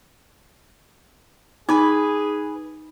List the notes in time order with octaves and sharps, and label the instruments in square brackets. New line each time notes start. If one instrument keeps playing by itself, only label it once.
[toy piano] D#4 D6 [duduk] G#4 [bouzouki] B4 G#5